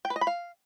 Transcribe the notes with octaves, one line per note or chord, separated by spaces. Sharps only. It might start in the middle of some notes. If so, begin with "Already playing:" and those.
G5
B4
D#5
B5
F5